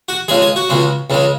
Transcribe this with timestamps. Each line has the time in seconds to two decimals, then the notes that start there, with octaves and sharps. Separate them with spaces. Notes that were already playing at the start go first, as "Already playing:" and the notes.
0.09 F#4
0.28 C#2 C#3 G#3 G#4
0.42 G#4
0.56 F#4
0.69 C#2 C#3 G#3
1.10 C#2 C#3 G#3